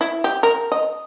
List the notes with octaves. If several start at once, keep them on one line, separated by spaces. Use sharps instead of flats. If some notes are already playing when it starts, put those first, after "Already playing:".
E4
G4
A#4
D#5